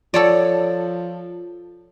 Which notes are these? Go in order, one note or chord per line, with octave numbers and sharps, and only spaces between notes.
F3 A4 C#5 D5